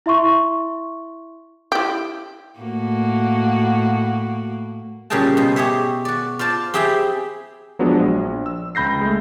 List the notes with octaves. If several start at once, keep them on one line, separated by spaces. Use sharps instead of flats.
E4 E5 C6 C#6
E4 G4
A2 A#3 F#4
A#2 C#3 G3 G#4 G5 A5
B2 C5
G4 G#4 C#5 E5
F#4 D5
F4 C5 D5 A5
C4 G4 G#4 E5 G5 B5
F3 F#3 G#3 B3 D4
A#1
E6
C#2 B5 G6 A#6 C7
G#3 A3